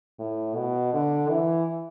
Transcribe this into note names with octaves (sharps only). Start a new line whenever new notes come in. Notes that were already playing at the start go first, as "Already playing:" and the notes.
A2
B2
D3
E3